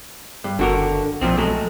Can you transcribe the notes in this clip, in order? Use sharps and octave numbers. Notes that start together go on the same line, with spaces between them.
G2
F#1 D3 F#4 A#4
B1 A#2 F3 C4
F#3 G#3 A3